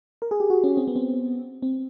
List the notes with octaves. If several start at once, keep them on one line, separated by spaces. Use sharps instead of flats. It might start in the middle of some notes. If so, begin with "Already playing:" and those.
A#4
G#4
G4
F#4
C#4
C4
B3
C4
C4